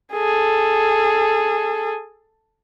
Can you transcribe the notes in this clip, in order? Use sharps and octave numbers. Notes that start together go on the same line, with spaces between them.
G#4 A4